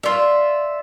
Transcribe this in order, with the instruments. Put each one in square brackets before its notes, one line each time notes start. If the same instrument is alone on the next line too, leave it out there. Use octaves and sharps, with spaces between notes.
[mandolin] F4 E5 [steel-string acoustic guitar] D5